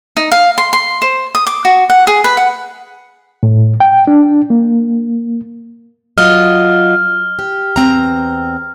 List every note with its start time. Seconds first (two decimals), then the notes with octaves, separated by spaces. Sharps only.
0.17 D#4
0.32 F5
0.58 C6
0.73 C6
1.02 C5
1.35 D#6
1.47 D6
1.65 F#4
1.90 F#5
2.07 G#4
2.24 B4
2.37 F#5
3.43 A2
3.80 G5
4.07 D4
4.50 A#3
6.18 F#3 F4 D#5 F6
7.39 G4
7.76 E2 C4 A#5